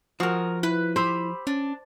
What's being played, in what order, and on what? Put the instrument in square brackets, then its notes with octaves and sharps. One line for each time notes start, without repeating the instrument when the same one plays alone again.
[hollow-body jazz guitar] F3 F#4 [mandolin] G#4 A#4
[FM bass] E4 [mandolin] B4
[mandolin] G4 B5 E6 [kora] C5
[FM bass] C#4 [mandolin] D4